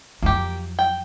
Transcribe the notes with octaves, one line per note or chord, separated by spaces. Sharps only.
F2 F#3 A#3 G4
G5